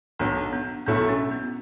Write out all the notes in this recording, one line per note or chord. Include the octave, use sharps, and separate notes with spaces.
B1 B2 F#3 B3 D4
B3 D4
B1 B2 F#3 A3 B3 D4 E4
C#4
B3